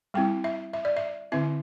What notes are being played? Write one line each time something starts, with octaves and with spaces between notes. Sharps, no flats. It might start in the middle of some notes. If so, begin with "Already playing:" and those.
G3 C4 E4 G5
E5
E5
D5
E5
D3 C4 E4 E5